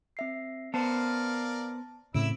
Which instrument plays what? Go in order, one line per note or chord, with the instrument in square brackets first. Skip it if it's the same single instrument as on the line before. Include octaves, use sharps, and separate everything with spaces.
[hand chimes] C4 E5 C7
[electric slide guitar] B3 C5 [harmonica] A#4 D5 F5 [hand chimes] A5
[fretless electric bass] A2 C#3 [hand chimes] C4 D7 [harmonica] E4 E5 E6